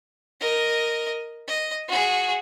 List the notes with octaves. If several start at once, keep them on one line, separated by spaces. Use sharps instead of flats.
A#4 D#5
D#5
F#4 G#4